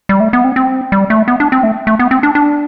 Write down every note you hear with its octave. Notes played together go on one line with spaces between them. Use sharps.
G3
A3
B3
C4
C4
G3
A3
B3
D4
C4
A3
A3
B3
C4
D4
D4